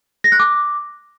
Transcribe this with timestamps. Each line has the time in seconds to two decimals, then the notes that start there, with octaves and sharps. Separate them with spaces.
0.24 A#6
0.32 F#6
0.40 D6